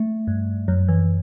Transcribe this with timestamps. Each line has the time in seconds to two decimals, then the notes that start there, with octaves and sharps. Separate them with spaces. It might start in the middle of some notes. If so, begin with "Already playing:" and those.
Already playing: A3
0.27 G2
0.68 F#2 F#3
0.89 E3